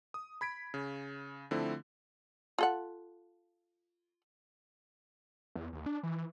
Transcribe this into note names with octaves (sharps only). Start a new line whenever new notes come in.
D#6
B5 G#6 B6 D7
C#3
D3 F3 A3 C4 E4
F4 A4 F#5
E2
D#2
D4
E3